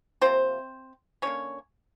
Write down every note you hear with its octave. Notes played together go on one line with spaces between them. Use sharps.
C3 F3 A#3 C4 C5
D3 G3 A#3 C#4 C#5